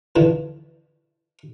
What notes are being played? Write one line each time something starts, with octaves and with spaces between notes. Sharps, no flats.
D3 E3 F3